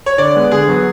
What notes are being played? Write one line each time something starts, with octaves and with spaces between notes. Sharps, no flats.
C#5
D3 D5
G#3 B3
D3 G#4
F#3 B3